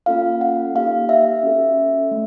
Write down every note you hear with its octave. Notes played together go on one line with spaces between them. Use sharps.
A#3 C#4 F4 A4 F5
F#5
A#3 D#4 G4 F5
E5
C#4 F#4 A4
A3